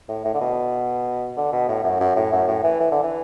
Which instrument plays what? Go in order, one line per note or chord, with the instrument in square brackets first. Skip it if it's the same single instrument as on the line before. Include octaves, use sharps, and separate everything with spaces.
[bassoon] A2
A2
D3
B2
D3
B2
A2
F#2
F#2
A2
F#2
A2
E3
E3
D3
E3